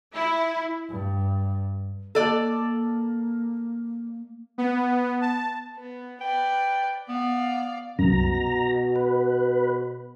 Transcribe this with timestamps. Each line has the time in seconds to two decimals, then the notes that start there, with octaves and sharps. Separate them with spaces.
0.13 E4
0.90 G2
2.15 A#3 A4 D5
4.58 B3
5.21 A5
5.78 B3
6.21 B4 D5 G5
7.09 B3 D5 F5
7.99 C2 F#2 B2 A#5
8.96 B4